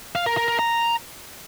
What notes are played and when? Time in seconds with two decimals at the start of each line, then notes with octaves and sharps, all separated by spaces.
0.15 F5
0.26 A#4
0.37 A#4
0.48 A#4
0.59 A#5